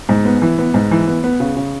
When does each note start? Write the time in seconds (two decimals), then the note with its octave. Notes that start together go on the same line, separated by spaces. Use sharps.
0.09 G#2
0.25 B3
0.42 E3
0.58 B3
0.74 G#2
0.91 E3
1.08 B3
1.24 B3
1.40 C#3
1.57 C#3